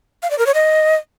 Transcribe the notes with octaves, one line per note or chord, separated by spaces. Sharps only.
F5
D5
A#4
C#5
D#5